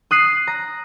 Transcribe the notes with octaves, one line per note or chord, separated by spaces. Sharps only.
D#6 F#6 C7 D#7
A#5